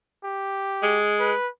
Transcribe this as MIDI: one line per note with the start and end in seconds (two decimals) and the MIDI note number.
0.24 1.01 67
0.83 1.32 56
1.20 1.49 71